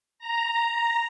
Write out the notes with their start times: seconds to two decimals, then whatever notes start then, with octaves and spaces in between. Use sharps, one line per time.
0.19 A#5
0.68 A#5